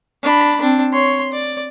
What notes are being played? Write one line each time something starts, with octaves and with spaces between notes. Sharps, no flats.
D4 B5
C4 D4
C#5 C6
D5